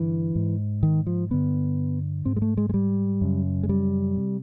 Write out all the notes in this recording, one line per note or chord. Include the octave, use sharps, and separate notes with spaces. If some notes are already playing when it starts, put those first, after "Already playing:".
Already playing: G2 D3 E3
G#2
D#3
F3
G2 D3 B3
G#2 C4
G#3
A3
G#3
G#3
G3
F#2 C#3
G#3
G3
C3